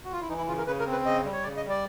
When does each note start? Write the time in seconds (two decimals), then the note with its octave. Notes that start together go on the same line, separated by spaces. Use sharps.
0.05 F#4
0.13 F4
0.21 E4
0.29 E3 D#4
0.38 E4
0.48 C#3 F4
0.58 A#4
0.66 C#3 B4
0.80 A#4
0.86 C4
0.92 B4
1.05 C#3 D#5
1.25 G3
1.33 C#5
1.43 C#3 D5
1.57 D#5
1.64 G3
1.69 D5